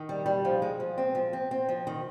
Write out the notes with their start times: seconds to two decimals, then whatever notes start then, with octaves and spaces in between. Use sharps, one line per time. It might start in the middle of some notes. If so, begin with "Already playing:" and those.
Already playing: D#3
0.09 G3
0.26 G3
0.45 F3
0.62 G#3
0.80 F3
0.98 C4
1.15 F3
1.33 C4
1.51 C4
1.69 F3
1.87 D#3